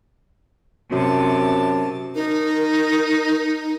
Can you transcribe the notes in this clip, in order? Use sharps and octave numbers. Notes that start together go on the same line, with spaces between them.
F#2 C3 A5
D#4 A#4